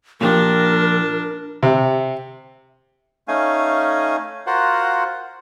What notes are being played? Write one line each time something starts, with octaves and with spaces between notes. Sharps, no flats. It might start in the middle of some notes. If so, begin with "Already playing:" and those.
A#2 F3 D4 G4 A#4
C3
A3 C#4 D#4 F5 G#5
F4 F#4 A#4 C5 F#5